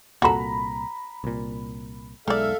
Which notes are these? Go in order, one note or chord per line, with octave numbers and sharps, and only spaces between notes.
C2 A#2 F#4 A4 A#5 B5
C2 A#2
B1 G#3 D#4 A4 D5 E5 F5